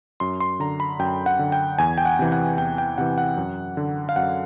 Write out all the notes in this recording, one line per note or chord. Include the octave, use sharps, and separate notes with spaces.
F#2 C6
C6
D3 A#5
B5
F#2 G5
F#5
D3
G5
E2 G#5
G5
F#5
C3 E3
F#5
E2 G5
G5
C3 E3 F#5
F#5
F#2
D3
F5
F#2 F#5